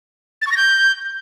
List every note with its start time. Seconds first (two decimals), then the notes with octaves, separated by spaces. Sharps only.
0.42 A6
0.47 C#6
0.52 A#6
0.57 G6